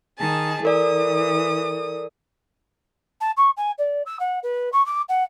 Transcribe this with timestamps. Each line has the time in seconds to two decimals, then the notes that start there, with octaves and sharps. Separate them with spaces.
0.18 D#3 G#4 A5
0.63 E3 A4 A#4 D5 D#6
3.21 A5
3.37 C#6
3.57 G#5
3.78 D5
4.06 E6
4.19 F#5
4.43 B4
4.72 C#6
4.86 D6
5.09 F#5